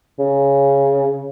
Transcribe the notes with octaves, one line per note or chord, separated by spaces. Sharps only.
C#3